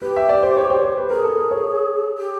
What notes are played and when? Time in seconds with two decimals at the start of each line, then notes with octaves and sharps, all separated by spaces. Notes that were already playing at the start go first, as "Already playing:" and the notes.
0.02 G4 B4
0.16 E5
0.29 D5
0.43 C5
0.57 C#5
0.70 C5
0.83 C5
0.97 B4
1.10 G#4 A#4
1.24 A4
1.37 A#4
1.51 C#5
2.18 G4